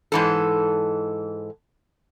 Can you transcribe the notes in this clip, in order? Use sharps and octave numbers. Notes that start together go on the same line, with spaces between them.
G#2 E3 A4